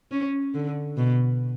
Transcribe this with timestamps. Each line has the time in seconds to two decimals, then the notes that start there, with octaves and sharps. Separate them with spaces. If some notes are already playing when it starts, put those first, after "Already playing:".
0.11 C#4
0.55 D3
0.97 B2